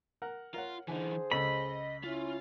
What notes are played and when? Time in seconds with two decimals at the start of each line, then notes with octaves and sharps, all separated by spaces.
0.22 A#4 F#5
0.54 F4 A#4 C#5 F#5
0.88 D3 E3 D#4 G#4 C5 G#5
1.32 C#2 A4 D#5 B5 E6
2.03 C#4 E4 F4